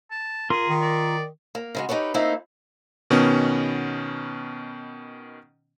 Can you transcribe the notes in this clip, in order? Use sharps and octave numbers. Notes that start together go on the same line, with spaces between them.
A5
F4 G#4 A#4 C6
D#3
D5
A#3
C#3 G#3 F#4
D#4 G4 A4 B4 C#5
A3 A#3 C4 D#4 E4 F5
B2 D#3 B3 C#4